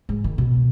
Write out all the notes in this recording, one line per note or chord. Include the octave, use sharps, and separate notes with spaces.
G#2
D#3
B2